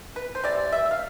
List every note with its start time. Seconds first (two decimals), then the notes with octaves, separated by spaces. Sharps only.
0.16 B4
0.35 C5
0.44 C3 E3 D5
0.72 E5
0.91 F5